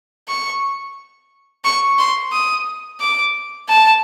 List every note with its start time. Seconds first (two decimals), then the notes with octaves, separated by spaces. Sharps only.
0.28 C#6
1.64 C#6
1.98 C6
2.32 D#6
3.00 D6
3.69 A5